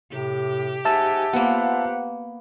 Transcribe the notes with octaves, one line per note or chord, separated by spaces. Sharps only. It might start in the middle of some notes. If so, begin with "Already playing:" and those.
A2 C3 G4
G#2 E5 F#5 G#5 A5 E6
A#3 B3 F4 C5 F#5